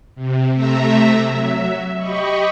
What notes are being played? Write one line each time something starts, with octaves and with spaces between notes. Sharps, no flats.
C3
C3 A3 E5 A#5
F#3 E5
G4 D#5 B5 C#6